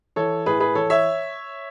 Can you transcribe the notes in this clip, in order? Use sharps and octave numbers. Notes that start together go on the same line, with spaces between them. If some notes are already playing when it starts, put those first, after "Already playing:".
E3 A4 C#5
A2 G#4 B4
G#4 B4
E3 A4 C#5
C#5 E5